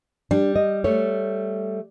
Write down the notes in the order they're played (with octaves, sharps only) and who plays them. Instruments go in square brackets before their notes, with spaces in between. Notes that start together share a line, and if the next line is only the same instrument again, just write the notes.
[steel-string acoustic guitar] G3 [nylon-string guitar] D4
[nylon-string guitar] D#5
A3 C#5